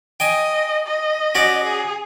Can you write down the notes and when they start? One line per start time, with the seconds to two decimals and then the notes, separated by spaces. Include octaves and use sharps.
0.20 D#5 G5 G#5
0.86 D#5
1.35 C#4 F#4 D5
1.64 G#4